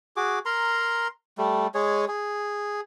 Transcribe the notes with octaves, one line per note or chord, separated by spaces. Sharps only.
F#4 G#4 D6
A#4 A#5 C6
G3 A3
G#3 G#4 C#5
G#4